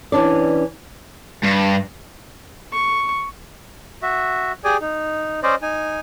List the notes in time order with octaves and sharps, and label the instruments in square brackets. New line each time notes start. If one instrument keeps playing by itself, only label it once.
[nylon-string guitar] E3 C#4 D4 D5
[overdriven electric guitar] G2
[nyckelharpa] C#6
[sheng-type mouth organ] F#4 E5
G4 G#4 D5 G#5
D#4
C#4 C5 D5 D#5
D#4 G#5